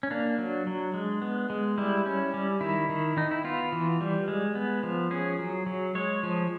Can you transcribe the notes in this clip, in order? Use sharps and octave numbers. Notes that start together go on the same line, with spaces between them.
C#4
A#3 D4
F#3
F#3
G#3
B3
G#3
G3 E4
C#4
G3
D#3 E4
D#3
D#3 D#4
E4
B3 F4
E3
G3
G#3
B3
F3
C#4 G#4
F#3
F#3
G#3 C#5
F3